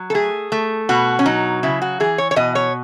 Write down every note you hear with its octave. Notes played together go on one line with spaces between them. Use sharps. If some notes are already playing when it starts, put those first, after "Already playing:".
Already playing: F#3
A4
A3 G#4
A3
B2 F#4
C#4
F#3 D#4
C#3 E4
F#4
E3 G#4
C#5
C#5
B2 D#5
C#5